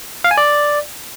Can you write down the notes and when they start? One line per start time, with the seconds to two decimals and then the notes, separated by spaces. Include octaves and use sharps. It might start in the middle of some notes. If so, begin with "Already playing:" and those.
0.24 F5
0.31 G#5
0.38 D5